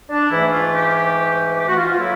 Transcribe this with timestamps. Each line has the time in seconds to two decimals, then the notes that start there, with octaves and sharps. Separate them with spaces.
0.09 D4
0.30 G#2 E3 A3 E4
0.51 F4
0.73 G4
1.57 G4
1.68 F#4
1.77 F4
1.88 F4
1.98 A2 F#3 A#3 E4